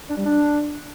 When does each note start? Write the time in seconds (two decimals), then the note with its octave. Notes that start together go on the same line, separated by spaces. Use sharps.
0.10 D4
0.18 G3
0.26 D4